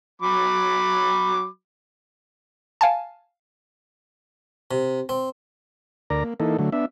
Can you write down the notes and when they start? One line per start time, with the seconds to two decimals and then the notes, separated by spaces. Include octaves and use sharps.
0.22 F#3 B5 D6
2.81 F5 G#5 A5
4.71 C3
5.09 C4
6.10 D2 A#4 D5 A#5
6.24 A#3
6.40 E3 A#3 D#4 A4
6.59 D3 F#3 A3
6.72 B3 D4 E5